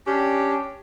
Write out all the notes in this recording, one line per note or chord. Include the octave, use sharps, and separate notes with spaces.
C#4 D4 G4